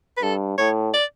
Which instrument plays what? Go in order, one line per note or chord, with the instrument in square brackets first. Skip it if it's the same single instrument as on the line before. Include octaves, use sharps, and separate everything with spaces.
[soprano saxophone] B4
[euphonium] G2 [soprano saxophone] A4
[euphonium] A2 [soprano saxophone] C#5
[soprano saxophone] D5